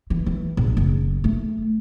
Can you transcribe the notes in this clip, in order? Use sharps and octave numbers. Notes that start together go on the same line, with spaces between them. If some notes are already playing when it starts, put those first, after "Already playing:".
E3
E3
A#1
F#1
A3